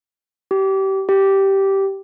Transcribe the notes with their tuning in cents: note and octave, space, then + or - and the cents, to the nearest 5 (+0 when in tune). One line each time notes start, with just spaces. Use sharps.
G4 -25
G4 -10